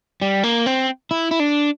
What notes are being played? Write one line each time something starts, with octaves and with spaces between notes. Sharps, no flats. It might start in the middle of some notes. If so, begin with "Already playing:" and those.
G3
A#3
C4
E4
E4
D4